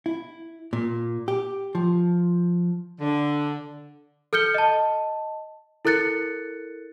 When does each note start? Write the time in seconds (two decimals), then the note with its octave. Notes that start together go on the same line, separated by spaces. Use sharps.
0.06 E4
0.73 A#2
1.28 G4
1.75 F3
3.01 D3
4.33 A4 F6 G6 C#7 G7
4.54 D#5 A5
5.85 E4 A4 A#4 F#6 A6 C#7